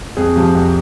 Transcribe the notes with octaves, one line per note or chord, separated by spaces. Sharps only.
F2 G#4
C3 F3
F2